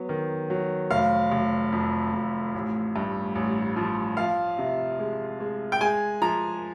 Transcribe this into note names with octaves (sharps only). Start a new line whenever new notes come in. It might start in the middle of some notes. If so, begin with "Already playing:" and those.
Already playing: F#3 B3
D#3
F#3
F1 F5
F1
F2
F2
A1
G2
A1
F3
F3 F5
C3
G#3
G#3
G5
G#3 G#5
F3 A#5